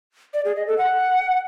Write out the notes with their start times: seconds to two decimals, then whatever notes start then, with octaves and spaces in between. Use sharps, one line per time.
0.34 D5
0.45 G#4
0.56 D#5
0.67 A4
0.78 F#5